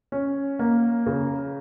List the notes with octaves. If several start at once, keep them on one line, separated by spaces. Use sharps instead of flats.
C#4
A#3
C#3